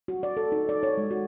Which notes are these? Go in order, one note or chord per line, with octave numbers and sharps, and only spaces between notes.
F#4
D5
A4
D#4
D5
C#5
G#3
F#4